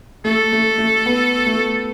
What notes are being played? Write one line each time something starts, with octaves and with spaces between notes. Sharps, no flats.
A3 A4
A3
A3
B3
A3